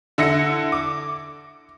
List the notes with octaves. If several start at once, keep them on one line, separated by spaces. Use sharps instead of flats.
D3 E4 A#6 C#7
D6